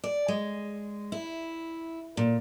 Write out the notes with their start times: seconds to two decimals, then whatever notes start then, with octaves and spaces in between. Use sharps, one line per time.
0.04 D5
0.28 G#3
1.12 E4
2.17 A#2